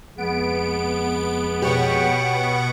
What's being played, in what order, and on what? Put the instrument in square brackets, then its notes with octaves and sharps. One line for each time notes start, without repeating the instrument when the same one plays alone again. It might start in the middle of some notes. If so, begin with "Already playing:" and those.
[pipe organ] F2 G#3 [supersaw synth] B3 D7
[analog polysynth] B2 F#5 C#6 [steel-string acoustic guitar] G4 C#5